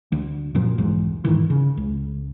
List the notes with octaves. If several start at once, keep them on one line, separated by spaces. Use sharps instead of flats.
D2
F#2 A#2 F3
B1 E2 G#2
D#1 G#2 D#3 E3
C#3
C#2